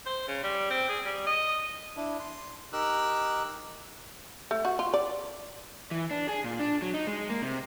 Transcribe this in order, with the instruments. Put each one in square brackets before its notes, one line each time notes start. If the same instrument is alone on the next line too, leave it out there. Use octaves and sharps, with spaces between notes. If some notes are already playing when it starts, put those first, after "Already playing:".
[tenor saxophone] C5
C#3
G3
C4
G#4
G3
D#5
[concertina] D4 E4
C6
D#4 G4 A#4 E6 F#6
[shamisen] A3
F#4
F4
D5
[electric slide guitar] E3
D4
G#4
A#2
D4
F#3
D#4
G#3
A#3
C3